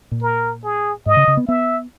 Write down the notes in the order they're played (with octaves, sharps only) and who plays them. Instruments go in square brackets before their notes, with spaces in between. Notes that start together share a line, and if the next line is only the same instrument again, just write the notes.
[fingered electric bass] A#2
[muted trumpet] A#4
G#4
[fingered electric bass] G#2 [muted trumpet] D#5
[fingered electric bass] C#3
C#3
B3
[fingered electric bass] B3 [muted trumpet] E5